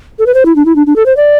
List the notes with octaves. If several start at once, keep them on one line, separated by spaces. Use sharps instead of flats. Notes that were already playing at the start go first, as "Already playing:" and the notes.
A4
B4
C5
E4
D4
E4
D4
D4
A4
C5
D5